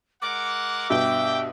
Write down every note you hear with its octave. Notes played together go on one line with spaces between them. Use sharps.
G#3 A#4 F#5 D6
G2 B2 E5 G5